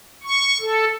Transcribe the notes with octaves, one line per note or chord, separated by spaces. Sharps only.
C#6
A4